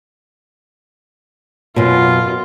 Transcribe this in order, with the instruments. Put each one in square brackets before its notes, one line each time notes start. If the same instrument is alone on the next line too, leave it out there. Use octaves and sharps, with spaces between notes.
[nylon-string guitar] F#2 B2 [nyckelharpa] F4